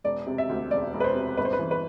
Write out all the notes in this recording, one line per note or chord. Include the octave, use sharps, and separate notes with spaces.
E1 D5
C3
E5
D2
E1 D5
E1
B4
C5
C3
G1 B4
C5
B4
E3
B4